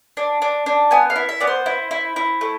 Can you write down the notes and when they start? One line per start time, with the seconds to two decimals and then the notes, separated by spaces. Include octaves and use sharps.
0.17 D4
0.42 D4
0.66 D4
0.91 B3 G#5
1.10 F5
1.16 E4
1.29 E5
1.40 B3 D5
1.47 C5
1.66 E4
1.91 E4
2.16 E4
2.41 A3